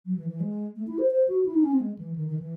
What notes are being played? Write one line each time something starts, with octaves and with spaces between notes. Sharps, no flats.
F#3
E3
E3
G#3
A3
E4
C5
C5
F#4
E4
D#4
C#4
C4
G#3
E3
D#3
D#3
E3